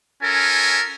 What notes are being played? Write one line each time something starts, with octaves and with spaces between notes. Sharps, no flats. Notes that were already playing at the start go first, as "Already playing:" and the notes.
C#4 F4 A4 A#4 G#5